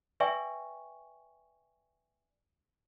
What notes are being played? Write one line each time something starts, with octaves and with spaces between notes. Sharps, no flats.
B4 D5 E5 G5 G#5 C#6